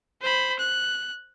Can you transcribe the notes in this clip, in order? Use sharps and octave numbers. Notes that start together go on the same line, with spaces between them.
C5 B5
F#6